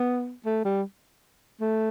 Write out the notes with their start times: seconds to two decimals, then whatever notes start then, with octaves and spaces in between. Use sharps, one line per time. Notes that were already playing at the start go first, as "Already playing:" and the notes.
Already playing: B3
0.46 A3
0.65 G3
1.61 A3